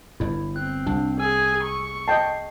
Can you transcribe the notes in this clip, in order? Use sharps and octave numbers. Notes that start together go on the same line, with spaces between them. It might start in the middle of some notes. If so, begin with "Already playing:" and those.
G1 G2 E4
C4 F#6
C2 D4
G#4 G#5 E6
C#6
D#5 G5 A5 C7